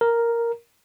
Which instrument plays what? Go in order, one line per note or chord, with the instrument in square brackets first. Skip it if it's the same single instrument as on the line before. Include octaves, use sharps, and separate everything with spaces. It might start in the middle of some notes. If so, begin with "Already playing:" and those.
[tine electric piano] A#4